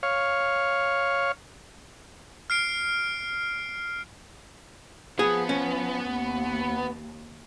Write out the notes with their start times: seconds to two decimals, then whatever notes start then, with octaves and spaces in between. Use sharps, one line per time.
0.03 C#5 F5
2.50 F6 C7 D7
5.19 F3 B3 G#4
5.49 C#4
6.05 D#2